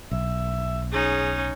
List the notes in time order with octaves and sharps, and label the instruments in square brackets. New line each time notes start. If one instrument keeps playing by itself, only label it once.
[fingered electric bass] B1 [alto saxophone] E5
[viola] C#4 D#4 [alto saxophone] G#4